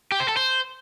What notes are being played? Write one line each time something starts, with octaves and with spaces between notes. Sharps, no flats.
G4
C5
A4
C5